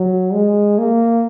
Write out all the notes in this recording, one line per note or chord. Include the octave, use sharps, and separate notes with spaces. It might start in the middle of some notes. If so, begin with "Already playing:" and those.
Already playing: F#3
G#3
A#3